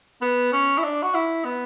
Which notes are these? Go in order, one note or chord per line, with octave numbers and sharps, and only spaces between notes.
B3
C#4
E4
D4
F#4
E4
B3